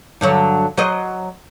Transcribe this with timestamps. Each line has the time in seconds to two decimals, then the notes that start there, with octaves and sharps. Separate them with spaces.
0.21 G2 D3 F#3
0.78 F#3 C5 D#5